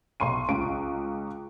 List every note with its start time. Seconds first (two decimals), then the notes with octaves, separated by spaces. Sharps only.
0.20 B1 C6 C#6 D#7
0.49 C#2 C#6 D7